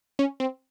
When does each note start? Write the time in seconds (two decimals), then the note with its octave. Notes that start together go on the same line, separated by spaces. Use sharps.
0.19 C#4
0.40 C4